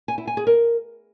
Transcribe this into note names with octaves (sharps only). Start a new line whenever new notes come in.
G#5
E4
G#5
G#4
A#4